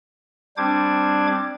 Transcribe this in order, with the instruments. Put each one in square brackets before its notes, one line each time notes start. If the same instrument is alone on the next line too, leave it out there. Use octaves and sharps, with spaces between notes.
[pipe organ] G3 C4 D4 C5 D6 G#6